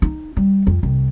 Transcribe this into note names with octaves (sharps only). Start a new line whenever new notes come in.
D#4
G3
F2
C2